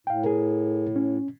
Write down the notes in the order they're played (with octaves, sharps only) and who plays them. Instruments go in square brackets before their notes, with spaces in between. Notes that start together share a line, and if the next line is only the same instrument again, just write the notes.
[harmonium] A2 [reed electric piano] F5 G5
[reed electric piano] G#4 A#4
C#4